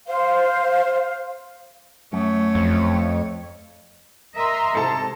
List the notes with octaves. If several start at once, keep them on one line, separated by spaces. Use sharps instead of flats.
C5 F5
F#2 A3 C#5
F2
A#4 D#5 E5 A#5 C6
G#2 C3 A4 A5